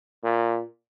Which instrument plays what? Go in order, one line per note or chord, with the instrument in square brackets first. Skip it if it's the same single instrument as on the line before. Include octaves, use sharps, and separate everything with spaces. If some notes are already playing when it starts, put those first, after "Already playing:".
[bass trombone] A#2